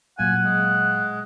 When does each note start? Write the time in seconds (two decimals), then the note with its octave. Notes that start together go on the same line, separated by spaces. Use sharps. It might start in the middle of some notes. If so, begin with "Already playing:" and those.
0.19 A#2 F#3 F5 F#5 G#5
0.43 G#3